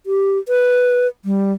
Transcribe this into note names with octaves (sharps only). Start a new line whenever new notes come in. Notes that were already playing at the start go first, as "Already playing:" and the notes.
G4
B4
G3